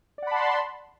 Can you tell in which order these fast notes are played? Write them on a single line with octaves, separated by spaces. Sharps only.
D5 F#5 B5 A5 C6